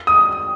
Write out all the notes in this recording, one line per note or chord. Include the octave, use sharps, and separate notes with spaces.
D#6